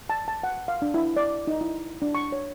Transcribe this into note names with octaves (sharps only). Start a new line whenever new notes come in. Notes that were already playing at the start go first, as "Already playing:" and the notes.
A5
A5
F#5
F5
D4
E4
D5
D#4
E4
D4
C#6
C#5